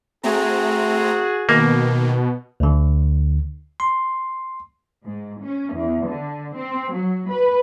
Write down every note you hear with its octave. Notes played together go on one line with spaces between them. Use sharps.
A3 C4 F#4 G#4 A#5
B2 D#3 A#3
D2 D3
C6
G#2
C#4
E2
D3
C4
F#3
B4